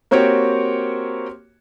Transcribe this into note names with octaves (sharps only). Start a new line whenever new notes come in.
A#3 C4 F#4 G4 C#5